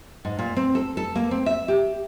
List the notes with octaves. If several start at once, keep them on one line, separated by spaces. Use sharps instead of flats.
G#2
A#2
C4
A4
A4
A#3
C4
E5
G4